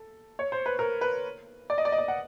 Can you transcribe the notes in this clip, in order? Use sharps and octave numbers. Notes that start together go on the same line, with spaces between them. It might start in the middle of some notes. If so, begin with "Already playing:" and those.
Already playing: A4
C#5
C5
B4
A#4
B4
D5
D#5
D5
D#5
D5
F#5